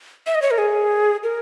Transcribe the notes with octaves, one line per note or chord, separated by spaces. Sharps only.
E5
D#5
C#5
A#4
G#4
A#4